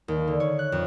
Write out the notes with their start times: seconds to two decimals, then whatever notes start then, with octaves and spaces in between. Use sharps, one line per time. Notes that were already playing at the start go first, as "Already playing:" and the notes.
0.08 D#2
0.27 D3
0.40 C#5
0.59 F#6
0.72 F2